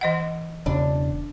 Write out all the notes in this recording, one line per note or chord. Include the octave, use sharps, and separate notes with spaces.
E3 D#5 F#5
E1 C#3 D4